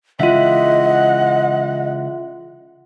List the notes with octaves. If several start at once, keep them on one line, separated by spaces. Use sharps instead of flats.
C#3 E3 G#3 F4 D#5 E5 F#5